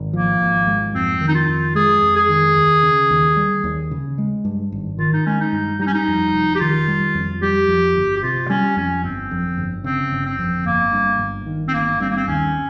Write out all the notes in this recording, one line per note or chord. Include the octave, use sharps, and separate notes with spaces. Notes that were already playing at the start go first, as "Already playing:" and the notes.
Already playing: G#1
F3 A#3
G#1
G#2
F2 C4
D#3
D#4
F4
F2
G#3 G#4
F2
G#4
D#3
D#2
C#3
D#2
G3
D#2
C#3
G#3
G2
G#1
D#3 F4
D#4
G#3 C#4
D#4
G2
G3 D#4
C#4
D#4
F2
F1
G4
D#3 F4
G3
F2
G3 G4
F2
G1
G4
C3 F4
G3 C#4
F2 C#4
G1 C4
F2
G1
C#3 C4
G1
C4
F2
G1 A#3
G2
G1
D#3
C4
G1 A#3
G2 C4
A#3
C4
D#2 C#4